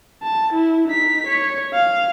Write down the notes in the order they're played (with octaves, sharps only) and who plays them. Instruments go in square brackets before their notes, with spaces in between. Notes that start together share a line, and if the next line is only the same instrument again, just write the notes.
[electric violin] A5
E4
D#4 B6
C#5
F5